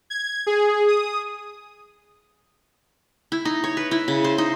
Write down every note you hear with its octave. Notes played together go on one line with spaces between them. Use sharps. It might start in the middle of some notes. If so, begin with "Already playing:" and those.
G#6
G#4
D#6
E4
D#4
C#5
B4
E4
C#3
C5
D#4